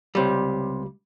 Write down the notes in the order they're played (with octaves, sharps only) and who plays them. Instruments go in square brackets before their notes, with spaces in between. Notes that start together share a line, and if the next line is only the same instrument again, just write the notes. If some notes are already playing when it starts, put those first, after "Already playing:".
[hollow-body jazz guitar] C#2 C3 G3